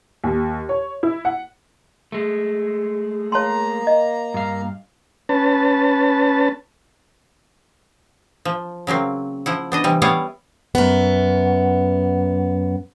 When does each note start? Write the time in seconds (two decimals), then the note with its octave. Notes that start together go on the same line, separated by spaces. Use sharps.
0.24 D#2
0.69 C#5
1.03 E4
1.25 F#5
2.12 G#3 A3
3.32 A#3 C#5 A5 A#5 C6
3.87 D#5
4.34 G2 F5
5.29 C#4 B4 A5
8.45 F3
8.87 C#3 F#3 A#3 C4
9.46 F3 E4 F#5
9.72 B3 D4 D#5
9.84 C3 E3 G3
10.02 G3 B3 E4 C#5 F5 F#5
10.75 F#2 B3